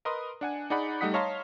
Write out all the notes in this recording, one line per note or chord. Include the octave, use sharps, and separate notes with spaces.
A#4 B4 D#5 C6 D#6
D4 F#5 G#5
D#4 G#4 D5 F#5 B5
G3 A3 D#4 F#5 D#6 B6
C#5 D#5 F5 A5 A#5 C6